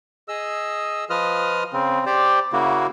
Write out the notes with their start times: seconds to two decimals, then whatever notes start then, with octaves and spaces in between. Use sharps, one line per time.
0.28 G#4 D#5 E6
1.10 F3 F4 B4 D#5 D#6 F6
1.73 C#3 C4
2.06 G4 C5 D5
2.53 C#3 A#3 E4 F#4